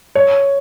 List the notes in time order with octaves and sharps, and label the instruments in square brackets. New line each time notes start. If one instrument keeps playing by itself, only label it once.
[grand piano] C#5